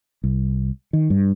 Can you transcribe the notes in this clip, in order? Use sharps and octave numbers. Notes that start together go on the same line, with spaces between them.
C2
D#3
G2